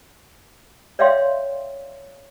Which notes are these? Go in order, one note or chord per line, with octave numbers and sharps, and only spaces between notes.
C#5 D5 E5 F5 G5 C6